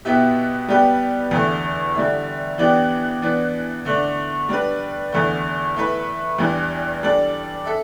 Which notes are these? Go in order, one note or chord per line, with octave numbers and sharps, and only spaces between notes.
B2 B3 E4 G4 E5
G3 B3 G4 B4
E2 D3 A3
D3 G3 E4
E3 B3 D4 G4 D5
E3 B3 D4
D3 A3 D4
G3 D4 B4
E2 D3 A3
A3 E4 B4
E2 E3 G3 D4
G3 D4 A4 D5
A4 E5